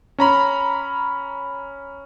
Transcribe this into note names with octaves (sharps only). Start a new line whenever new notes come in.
C#4 A#5 B5